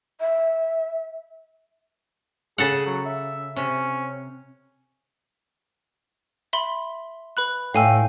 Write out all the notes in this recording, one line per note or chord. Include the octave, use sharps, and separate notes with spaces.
E5
C#3 G#4 A4 F#5
F#3
E5
C3 C#4
E5 B5 C6
B4 B5 F#6
A2 F5 G5 G#5 E6